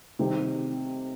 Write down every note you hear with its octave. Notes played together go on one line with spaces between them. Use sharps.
C3 D#3 G3 C4 G4